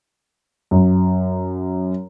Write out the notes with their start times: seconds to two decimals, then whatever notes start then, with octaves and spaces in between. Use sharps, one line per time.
0.71 F#2